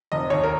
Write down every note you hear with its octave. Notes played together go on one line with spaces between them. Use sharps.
F1 D#5
D#2 C#5
A#4